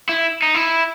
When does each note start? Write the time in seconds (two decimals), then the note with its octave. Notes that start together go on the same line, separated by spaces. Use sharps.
0.09 E4
0.42 D#4
0.55 E4